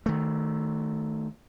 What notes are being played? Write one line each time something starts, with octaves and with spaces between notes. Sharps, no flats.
D#3 A3